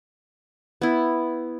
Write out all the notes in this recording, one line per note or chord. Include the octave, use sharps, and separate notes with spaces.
B3 E4